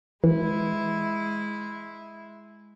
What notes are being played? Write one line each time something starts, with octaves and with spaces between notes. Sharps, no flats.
E3 G#3 E4